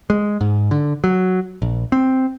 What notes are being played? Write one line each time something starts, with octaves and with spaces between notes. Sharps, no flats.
G#3
G#2
D3
F#3
A#1
C4